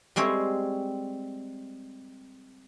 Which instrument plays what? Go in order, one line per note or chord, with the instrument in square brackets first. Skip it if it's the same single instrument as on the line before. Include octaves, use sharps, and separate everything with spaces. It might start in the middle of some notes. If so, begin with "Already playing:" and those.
[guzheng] G3 G#3 C4 C#5